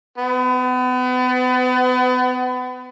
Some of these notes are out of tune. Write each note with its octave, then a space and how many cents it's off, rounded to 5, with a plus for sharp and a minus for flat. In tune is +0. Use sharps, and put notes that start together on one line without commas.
B3 +35